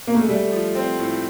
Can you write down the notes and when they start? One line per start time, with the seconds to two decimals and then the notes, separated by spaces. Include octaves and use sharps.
0.07 A#3
0.15 A3
0.21 G#3
0.29 G3 A3
0.52 F3
0.75 C4
0.99 A2